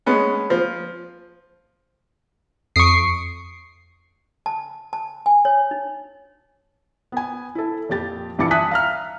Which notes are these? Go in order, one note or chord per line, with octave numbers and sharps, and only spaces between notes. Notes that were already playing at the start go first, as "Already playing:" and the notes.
G#3 B3 C#4
F3
F2 C#6 D#6 C7 D7
A5
A5
G#5
C#5
D#4
B3 G#5
E4 A4
F2 A#2 G4 A6
A#1 G2 E3 D6 A6 C#7
E5 G#5 A5 D#6 F#6 B6
F5 A#5 F6